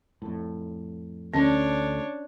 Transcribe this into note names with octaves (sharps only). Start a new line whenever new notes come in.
F2 A2
D2 C#4 D4 C#5